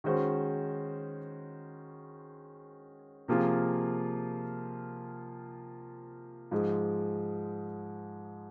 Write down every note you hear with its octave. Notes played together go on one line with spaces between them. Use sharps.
D#3 G#3 C#4 F#4 C5
C3 F3 A#3 F4 G#4
G#2 F3 G#3